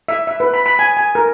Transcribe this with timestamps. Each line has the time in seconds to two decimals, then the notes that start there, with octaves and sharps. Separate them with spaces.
0.08 E5
0.27 E5
0.40 B4
0.54 B5
0.66 B5
0.79 G#5
0.97 G#5
1.15 A#4